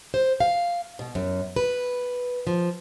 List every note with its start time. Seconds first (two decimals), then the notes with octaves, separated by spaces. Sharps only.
0.14 C5
0.40 F5
0.99 B2
1.15 F#2
1.56 B4
2.47 F3